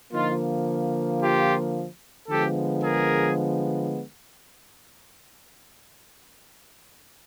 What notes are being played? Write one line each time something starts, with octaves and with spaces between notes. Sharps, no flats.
D3 F3 A#3 D#4 F4
F4 G4
D3 F3 G#3 B3 G4 A4
G#4 A#4